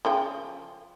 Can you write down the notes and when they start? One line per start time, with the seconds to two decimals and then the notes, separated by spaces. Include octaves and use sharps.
0.05 C#3 F3 G5